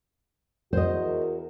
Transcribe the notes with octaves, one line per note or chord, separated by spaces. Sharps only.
E2 F#4 A#4 C5 D#5